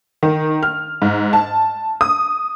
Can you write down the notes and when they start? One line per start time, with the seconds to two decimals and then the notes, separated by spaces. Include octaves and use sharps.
0.23 D#3
0.63 F6
1.02 G#2
1.33 A5
2.01 D#6